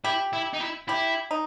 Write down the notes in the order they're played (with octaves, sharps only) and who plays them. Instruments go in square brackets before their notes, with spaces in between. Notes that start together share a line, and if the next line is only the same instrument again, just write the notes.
[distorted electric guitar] E4 [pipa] G4
[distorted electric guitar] E4
D#4
E4
[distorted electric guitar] E4 [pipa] G4
[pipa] D#4